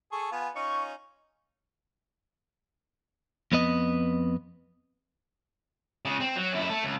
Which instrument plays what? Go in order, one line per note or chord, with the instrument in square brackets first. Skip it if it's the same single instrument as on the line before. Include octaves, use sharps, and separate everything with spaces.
[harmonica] G#4 A4 C#6
B3 F4 G#5
[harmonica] C#4 D#4 F4 [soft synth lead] C#6
[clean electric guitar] F2 B3 B4 D#5
[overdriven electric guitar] C#3 G#3
C4
F#3
F#2 E4
A3 A4
C#2